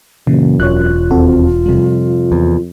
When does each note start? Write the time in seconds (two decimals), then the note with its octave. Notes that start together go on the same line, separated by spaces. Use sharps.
0.27 F#2 A#2 C#3 E3 A#3
0.60 E1 F4 C#5 F#6
1.11 D#2 C4 F#4 A4
1.66 F2 C3 G3
2.32 E2